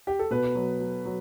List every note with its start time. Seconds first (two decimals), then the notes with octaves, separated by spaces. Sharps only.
0.07 G4
0.19 A4
0.31 B2 B4
0.55 F#3
0.80 F#3
1.05 F#3